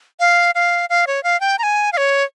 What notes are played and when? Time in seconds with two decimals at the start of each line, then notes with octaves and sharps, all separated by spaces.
0.20 F5
0.55 F5
0.90 F5
1.07 C#5
1.24 F5
1.40 G5
1.59 A#5
1.63 G#5
1.93 F5
1.97 C#5